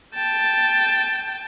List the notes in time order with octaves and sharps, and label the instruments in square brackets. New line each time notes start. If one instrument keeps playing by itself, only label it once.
[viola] G5 A5